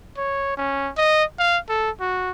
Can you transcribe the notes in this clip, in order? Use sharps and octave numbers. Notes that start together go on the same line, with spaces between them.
C#5
C#4
D#5
F5
A4
F#4